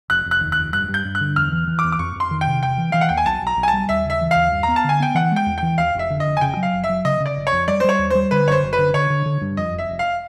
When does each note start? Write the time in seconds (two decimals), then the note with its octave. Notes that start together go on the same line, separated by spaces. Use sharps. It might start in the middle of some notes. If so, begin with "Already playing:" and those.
0.10 F1 F#6
0.26 F1
0.31 F#6
0.41 D#2
0.52 F1 F#6
0.72 G2 F#6
0.89 G2
0.94 G6
1.05 G2
1.15 F#6
1.21 D3
1.36 E2 F6
1.52 E3
1.67 E3
1.79 D6
1.84 E2
1.92 D6
1.99 F2 C#6
2.16 F2 C6
2.31 D#3
2.41 G5
2.47 C3
2.62 E1 G5
2.78 E3
2.92 E3 F5
3.01 F#5
3.09 D#2 G5
3.17 G#5
3.26 B1 A5
3.42 B1 A#5
3.57 B1
3.63 G#5
3.68 A5
3.73 G3
3.89 D#2 E5
4.05 C#3
4.10 E5
4.21 E3
4.31 D#2 F5
4.52 G2
4.63 B3 A#5
4.76 A5
4.84 D3 G#5
5.00 B3 G5
5.15 E3 F#5
5.32 G#3 G5
5.46 E2
5.58 E3 G5
5.78 D#2 F5
5.95 F1 E5
6.10 D3
6.20 D#5
6.26 F1
6.37 G#5
6.41 C#3 G5
6.57 F#3
6.63 F5
6.73 F#1
6.84 E5
6.89 F#3
7.05 C#3 D#5
7.20 C#3
7.26 D5
7.36 G1
7.47 C#5
7.52 F2
7.68 G3 D5
7.80 C5
7.84 G3 C#5
7.99 D#2
8.10 G3 C5
8.31 D3 B4
8.47 F#1 C#5
8.52 C5
8.63 F#1
8.73 B4
8.78 D3
8.94 D3 C#5
9.10 D3
9.26 D3
9.41 G2
9.57 F2 D#5
9.74 F1 E5
9.89 F1
9.99 F5